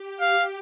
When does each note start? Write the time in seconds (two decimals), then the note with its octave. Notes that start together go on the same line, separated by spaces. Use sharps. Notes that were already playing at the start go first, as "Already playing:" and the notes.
Already playing: G4
0.21 F5